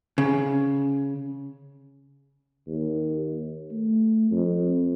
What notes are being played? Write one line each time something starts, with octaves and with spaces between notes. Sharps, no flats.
C#3
D#2
A3
F2